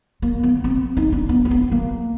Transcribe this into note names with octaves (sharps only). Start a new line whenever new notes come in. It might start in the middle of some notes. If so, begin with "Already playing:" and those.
A#3
B3
C4
D#4
D4
B3
A#3
B3
A#3